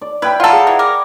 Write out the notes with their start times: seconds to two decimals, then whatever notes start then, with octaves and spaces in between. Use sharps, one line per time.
0.01 D5
0.22 E4 B4 G5 B5
0.40 F4 A4 F5 F#5 A#5
0.53 G#4
0.67 E3
0.79 A#4 D6